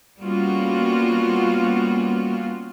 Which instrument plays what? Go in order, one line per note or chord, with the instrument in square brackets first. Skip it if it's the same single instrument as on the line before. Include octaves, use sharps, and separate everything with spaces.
[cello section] G3 A#3 B3 C#4 F4 F#4